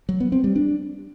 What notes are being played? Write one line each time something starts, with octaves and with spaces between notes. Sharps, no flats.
F#3
B3
C4
G3
D4